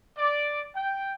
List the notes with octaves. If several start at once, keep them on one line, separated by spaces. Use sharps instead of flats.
D5
G5